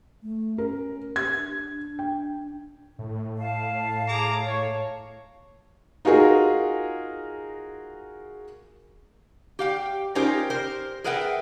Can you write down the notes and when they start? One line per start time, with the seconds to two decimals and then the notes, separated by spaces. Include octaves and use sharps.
0.23 A3
0.58 C#4 A#4
1.16 G4 G#6
1.36 D4
1.99 G5
2.99 A2
3.38 F5 A5
4.08 G#4 A#5 D6
4.46 C#5
6.05 D#4 F4 F#4 G#4 A#4
9.59 G4 F5 G5
10.15 C#4 D#4 F4 G4 A#4 C5
10.50 A#4 C5
11.04 G#4 A#4 B4 E5 F#5 G5